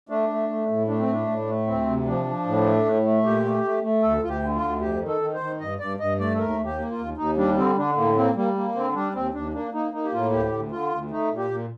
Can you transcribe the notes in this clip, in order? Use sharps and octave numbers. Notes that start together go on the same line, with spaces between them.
A3 D4
A3
A3
A2
A3 D4
C4
A2 D4
A2
A3
D2 C4
C3
F3 D4
F3
A2
A3
A2
A3
A#2 G4
A3
A3
A3
D2 A4
D2 F4
G4
D3
F4
D2
F2 G4
D#3
A4
D#3
C5
D#3
G2 D#5
G2 D5
G2 D#5
A3 D5
A4
D#2 A#4
D#2
G4
A#3
F4
D#2
D#2 D#4
G3 D4
D3 C4
D3 D4
A2 A#3
A#3 C4
G3 A#3
A#3
D3 C4
G3 D4
D#2 C4
D#2 D4
A#3 D4
A#3 D#4
A#3 D#4
G4
A2 F4
D2 G4
D2
D3 F4
D2
A3 D#4
A#2
G4
A#2